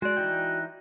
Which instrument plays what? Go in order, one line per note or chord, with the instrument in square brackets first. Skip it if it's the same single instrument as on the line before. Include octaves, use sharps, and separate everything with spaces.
[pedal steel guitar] G#3 [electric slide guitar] F#4 D5 [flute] F#6
[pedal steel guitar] E3 D#4 G5